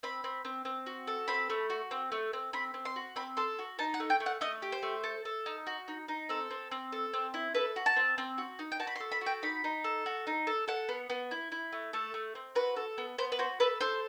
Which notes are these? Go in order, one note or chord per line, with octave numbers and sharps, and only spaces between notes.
C4 B5
C4
C4
C4
F#4
A4
C4 B5
A3
F#4
C4
A3
C4
C4 B5
C4
C6
F#4
C4 B5
A4 C6
F#4
D#4 A5
F#5
A3
G5
A3
F#5
A3 D#5
G4
C5
A3
A4
A4
D#4
F#4
D#4
D#4
C4 A4
C4
C4
A4
C4
E4
A4 B4
F#4
A5
C4
C4
F#4
D#4
G5
F#4 A5
B5
C6
A4
B5
F#4
G5
D#4 B5
D#4
A4
F#4
D#4
A4
A4 F#5
B3
B3
E4
E4
A3
A3 A4
A3
C4
F#4 B4
A4
B3
B3 C5
B4
F#4 C5
A4 B4
A4 C5